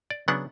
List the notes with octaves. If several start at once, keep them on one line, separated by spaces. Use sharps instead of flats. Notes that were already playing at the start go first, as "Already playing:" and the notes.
D5
C#3 F#3 B3 D4 F#5